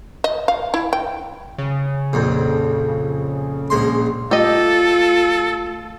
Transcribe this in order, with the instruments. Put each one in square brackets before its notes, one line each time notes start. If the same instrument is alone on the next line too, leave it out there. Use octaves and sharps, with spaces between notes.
[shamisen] D#5
F5
E4
G5
[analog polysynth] C#3
[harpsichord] A#1 F2
A#1 G#3 C6
[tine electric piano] A3 [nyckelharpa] F4 [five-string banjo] G4 D#5 [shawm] A4